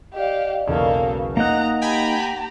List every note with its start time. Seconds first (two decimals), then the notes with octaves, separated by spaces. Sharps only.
0.14 G4 D5 D#5 F5
0.67 B1 E2 C#3 A#3 A4
1.37 A#3 D#4 D#5 F#5 A#5 F#6
1.82 G4 G5 G#5 A#5 B5